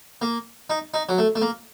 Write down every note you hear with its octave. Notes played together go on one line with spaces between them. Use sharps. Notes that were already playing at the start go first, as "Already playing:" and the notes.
A#3
D#4
D#4
F#3
A3
A3
A#3